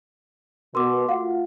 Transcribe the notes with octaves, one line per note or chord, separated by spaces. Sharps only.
B2 A#4 C6 D6
A3 F4 F#4 F5 F#5